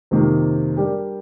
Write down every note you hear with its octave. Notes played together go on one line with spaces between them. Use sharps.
F2 C3 D#3 A#3
G3 D4 G4 A#4